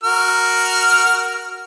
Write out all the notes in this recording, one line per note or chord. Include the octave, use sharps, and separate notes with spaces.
F#4 A#4 F6